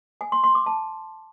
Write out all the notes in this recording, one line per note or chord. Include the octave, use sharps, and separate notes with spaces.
G#5
C6
C6
D6
A5